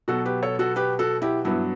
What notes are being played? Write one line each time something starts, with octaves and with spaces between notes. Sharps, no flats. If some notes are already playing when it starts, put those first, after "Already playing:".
B2 F#3 B3 F#4 A4
G4 B4
A4 C#5
F#4 A4
G4 B4
F#4 A4
E4 G4
G2 F#3 B3 E4